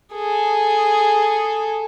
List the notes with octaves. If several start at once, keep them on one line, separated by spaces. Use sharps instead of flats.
G#4 A4